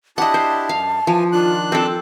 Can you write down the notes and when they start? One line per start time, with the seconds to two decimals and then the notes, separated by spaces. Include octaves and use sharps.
0.18 D4 E4 G4 D#5 F#5 A5
0.34 C5
0.69 F#2 F5
1.07 E3 F3 G#5
1.32 D#3 D4 F4 F#6
1.72 C4 F4 A4